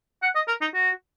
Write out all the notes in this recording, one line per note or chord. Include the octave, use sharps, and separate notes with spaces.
F#5
D#5
A#4
D#4
F#4